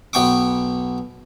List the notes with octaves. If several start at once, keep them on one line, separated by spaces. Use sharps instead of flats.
B1 B3 G5 C#6 D6